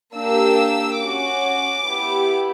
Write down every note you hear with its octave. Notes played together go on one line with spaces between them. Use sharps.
A#3 D4 G4 E6
C#4 F#4 D6
B3 E4 G4